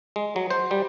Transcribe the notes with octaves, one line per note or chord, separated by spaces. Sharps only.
G#3
F#3
C5
G3